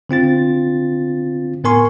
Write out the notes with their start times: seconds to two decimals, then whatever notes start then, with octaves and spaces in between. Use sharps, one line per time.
0.09 D3 C4 F4 A6
1.64 A2 B3 A#4 G#5 C6 C#6